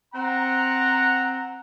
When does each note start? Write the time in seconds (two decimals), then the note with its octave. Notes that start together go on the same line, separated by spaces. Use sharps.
0.14 C4 F#5 A#5